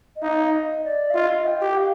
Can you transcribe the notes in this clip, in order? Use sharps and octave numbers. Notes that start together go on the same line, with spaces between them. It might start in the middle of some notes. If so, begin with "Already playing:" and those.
D#5
D#4 F5
D#5
D5
F5
F4 D#5
G5
G4
F5